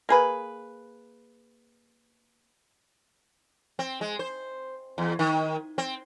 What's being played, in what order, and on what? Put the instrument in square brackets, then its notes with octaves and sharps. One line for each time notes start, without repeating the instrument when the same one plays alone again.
[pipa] A#3 G#4 B4
[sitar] C4
G#3
C5
E2
D#3
C4